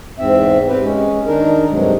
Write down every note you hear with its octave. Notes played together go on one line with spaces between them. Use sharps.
E2 G#2 C4 E5
C4 G4 B4
G#3 C#4
D#3 D4 D#4 A#4
G2 C3 F#3 G#3